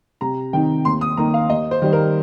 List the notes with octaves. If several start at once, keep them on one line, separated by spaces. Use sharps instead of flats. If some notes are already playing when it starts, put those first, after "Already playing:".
C3 A#5
D#3 C4 D#4 G5
D#2 C6
D#6
D#3 A#3 D#4 A#5
F5
D#2 D#5
C5
D#3 G3
A#4